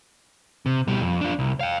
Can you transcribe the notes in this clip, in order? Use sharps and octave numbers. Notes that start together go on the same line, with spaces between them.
C3
B2 G3
F2
D4 F4
C2
F5 G5